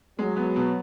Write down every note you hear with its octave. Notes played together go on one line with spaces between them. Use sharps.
F#3 G#3
B3
B2